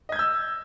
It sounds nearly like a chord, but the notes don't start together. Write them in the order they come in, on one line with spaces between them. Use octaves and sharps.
D#5 G#6 G6 E6